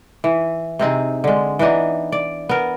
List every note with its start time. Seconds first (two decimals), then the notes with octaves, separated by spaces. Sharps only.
0.24 E3
0.79 C3 C4 D#4 G#4
1.24 D3 G#3
1.59 E3 B3 D4 D#4
2.12 D5
2.49 B3 A#4